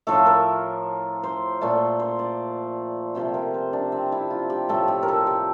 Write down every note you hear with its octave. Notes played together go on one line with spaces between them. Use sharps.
A2 F3 A3 A4
A#4
C5
A#2 A3
C5
D5
C3 F3 A3 C5
A#4
C5
D4
C4
E4
F4
G4
A2 F3 A3 A4
G4
A#4
A4
G4